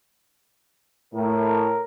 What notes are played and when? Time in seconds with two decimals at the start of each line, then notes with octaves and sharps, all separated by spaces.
1.14 A2 A#4